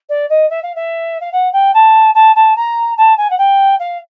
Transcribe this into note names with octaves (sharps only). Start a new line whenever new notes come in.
D5
D#5
E5
F5
E5
F5
F#5
G5
A5
A5
A5
A#5
A5
G#5
F#5
G5
F5